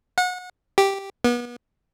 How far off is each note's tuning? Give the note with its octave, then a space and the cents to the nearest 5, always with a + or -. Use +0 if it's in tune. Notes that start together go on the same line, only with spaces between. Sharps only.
F#5 -30
G4 +0
B3 -35